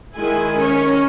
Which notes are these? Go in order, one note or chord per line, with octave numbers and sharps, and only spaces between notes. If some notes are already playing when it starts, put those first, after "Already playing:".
D#3 G#3 E4 G#5
C#4 A#4 C#5